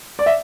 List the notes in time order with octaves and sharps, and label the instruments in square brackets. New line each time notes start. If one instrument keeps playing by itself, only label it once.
[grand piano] D5
E5